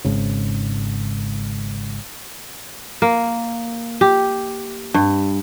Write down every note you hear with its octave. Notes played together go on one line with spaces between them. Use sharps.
G#1 G#2 C#3
A#3
G4
G2